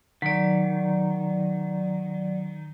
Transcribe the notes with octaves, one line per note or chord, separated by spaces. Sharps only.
D#3 F#3 D5